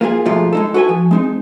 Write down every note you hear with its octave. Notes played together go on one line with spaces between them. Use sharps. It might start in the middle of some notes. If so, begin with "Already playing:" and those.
A#3 F4 G4 G#4
G#2 B2 F3 G#3 A3 F4
G#3 D#4 A4
F#4 A4 B4 D#5 G#5
F3
G#3 C4 D#4